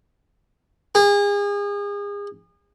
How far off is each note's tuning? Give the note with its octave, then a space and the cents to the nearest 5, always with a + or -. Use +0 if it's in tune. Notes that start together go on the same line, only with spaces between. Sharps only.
G#4 -35